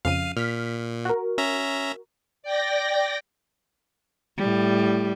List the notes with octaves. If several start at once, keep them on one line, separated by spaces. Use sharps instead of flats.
F2 C#3 F5 D#7
A#2 F6 B6
F#4 A#4
C#4 E5 A#5
D5 G5 A#6
A2 G3